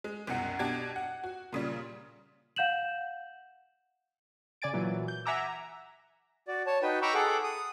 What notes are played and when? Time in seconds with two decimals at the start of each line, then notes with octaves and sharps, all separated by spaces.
0.04 G#3
0.27 C2 F#2 B2 F#5 C#7
0.59 B2 D4 G4 G#6
0.96 F#5
1.24 F#4
1.52 A#2 C#3 G3
2.56 F5 F#5 G6 E7 F#7
4.62 C#3 D5 G#5 A6 D7
4.73 A#2 E3 F#3
5.08 G6
5.26 E5 F#5 G#5 A#5 D6 E6
6.48 F#4 D5
6.67 C#5 A5
6.82 D#4 F#4 B4 G5
7.02 G5 A#5 B5 C#6 D6 E6
7.14 G#4 A4 F#5 D6
7.43 D#6